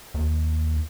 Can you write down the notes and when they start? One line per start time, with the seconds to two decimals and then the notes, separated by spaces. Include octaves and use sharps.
0.14 D#2